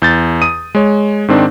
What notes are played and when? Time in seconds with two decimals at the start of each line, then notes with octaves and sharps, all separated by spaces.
0.02 E2 G6 A6
0.42 D#6 D#7
0.75 G#3 C#5
1.28 G#2 D#3 C4 D4